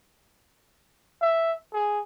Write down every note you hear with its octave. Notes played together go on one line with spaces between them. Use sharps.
E5
G#4